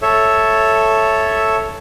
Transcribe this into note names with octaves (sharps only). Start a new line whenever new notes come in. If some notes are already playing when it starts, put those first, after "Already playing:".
A4 C#5 E5